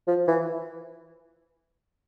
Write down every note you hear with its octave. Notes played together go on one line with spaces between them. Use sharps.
F3
E3